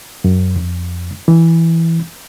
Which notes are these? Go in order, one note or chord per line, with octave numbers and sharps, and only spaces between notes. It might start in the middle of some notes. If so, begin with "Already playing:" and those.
F#2
F2
E3